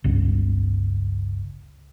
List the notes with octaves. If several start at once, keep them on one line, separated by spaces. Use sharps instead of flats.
G1 C#2